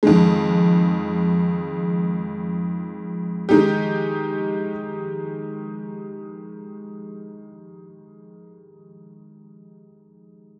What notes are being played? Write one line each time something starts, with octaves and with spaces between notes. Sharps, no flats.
F2 D#3 G#3
D#3 G#3 D#4 G4